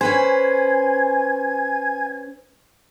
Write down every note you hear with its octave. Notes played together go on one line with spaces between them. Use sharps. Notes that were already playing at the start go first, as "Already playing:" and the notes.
C#4 B4 C5 G#5